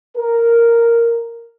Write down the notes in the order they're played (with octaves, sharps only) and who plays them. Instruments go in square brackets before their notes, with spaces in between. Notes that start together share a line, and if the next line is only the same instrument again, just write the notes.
[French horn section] A#4